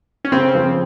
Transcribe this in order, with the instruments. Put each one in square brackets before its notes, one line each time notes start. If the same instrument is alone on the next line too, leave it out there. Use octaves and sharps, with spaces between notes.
[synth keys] C#4
[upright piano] C#3 [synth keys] C4
[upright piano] F3